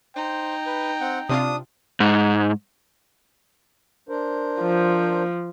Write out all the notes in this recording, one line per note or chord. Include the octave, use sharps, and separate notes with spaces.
D#4 C5 G5
B4
C4 F#5
C3 C4 D4 F4 D#6
G#2
D4 A#4 C5
F3